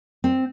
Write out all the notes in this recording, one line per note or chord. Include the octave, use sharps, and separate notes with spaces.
C4